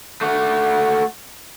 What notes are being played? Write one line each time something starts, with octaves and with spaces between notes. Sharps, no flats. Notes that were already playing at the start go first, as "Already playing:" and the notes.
A3 F#4